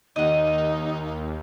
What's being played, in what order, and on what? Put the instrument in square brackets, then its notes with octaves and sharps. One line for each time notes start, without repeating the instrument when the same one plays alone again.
[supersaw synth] D#2 [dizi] D#4 [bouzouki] D#5 F#5